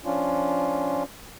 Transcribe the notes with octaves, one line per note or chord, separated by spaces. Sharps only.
F3 C#4 D4 F4